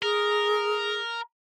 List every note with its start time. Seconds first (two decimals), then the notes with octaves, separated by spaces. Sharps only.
0.02 G#4 A#4